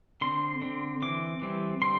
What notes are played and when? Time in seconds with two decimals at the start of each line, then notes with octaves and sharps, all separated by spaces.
0.21 D3 C4 C6
0.62 D3 C4
1.02 E3 C4 D6
1.42 E3 G3 C4
1.82 D3 G3 C4 C6